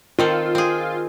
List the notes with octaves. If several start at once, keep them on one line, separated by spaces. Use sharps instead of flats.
D#3 C4 F4 A4
C4 G#4